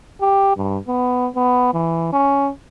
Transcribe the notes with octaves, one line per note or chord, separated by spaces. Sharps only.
G4
G2
B3
B3
E3
C#4